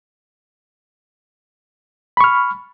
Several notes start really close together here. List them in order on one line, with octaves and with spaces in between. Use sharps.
B5 C#6 F6